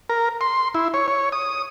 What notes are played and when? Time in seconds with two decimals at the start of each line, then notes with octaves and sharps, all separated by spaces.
0.10 A#4
0.41 C6
0.75 E4
0.94 C#5
1.08 C#5
1.32 D#6